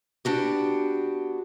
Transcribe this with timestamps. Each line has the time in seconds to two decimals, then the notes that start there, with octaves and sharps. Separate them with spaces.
0.25 B3 D4 F#4 G4